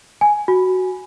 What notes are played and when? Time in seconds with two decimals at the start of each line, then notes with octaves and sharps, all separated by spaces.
0.21 G#5
0.48 F#4